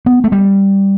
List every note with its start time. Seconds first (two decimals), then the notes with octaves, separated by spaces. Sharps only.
0.06 B3
0.24 A3
0.32 G3